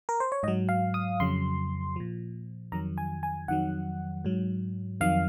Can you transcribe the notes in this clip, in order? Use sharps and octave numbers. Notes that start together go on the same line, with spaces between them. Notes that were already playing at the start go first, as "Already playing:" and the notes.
A#4
C5
C#5
G#2 F#3 D#5
F5
D#6
F2 C#3 F#3 C6
A#2 F3
F2 D#3 F#3 A#5
G#5
G#5
F2 D#3 F#3 F#5
G#2 F#3
F2 D#3 F#3 F5